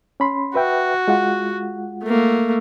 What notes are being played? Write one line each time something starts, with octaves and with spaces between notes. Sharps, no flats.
C#4 B5 C6
F#4 B4 E5 G5
G#3 F4 F#5
A3 A#3